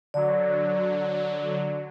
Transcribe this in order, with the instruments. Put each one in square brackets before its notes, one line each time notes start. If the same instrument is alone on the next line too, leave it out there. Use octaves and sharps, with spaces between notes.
[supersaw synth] D3 F#3 [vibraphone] D5